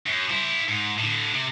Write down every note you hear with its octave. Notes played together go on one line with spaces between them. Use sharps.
F#2
E4 C5
G#2
A2 D3
C3